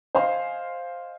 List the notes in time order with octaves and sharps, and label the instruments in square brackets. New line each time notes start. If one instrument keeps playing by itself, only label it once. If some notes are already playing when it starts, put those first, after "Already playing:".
[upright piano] C5 D#5 F5 G#5 C6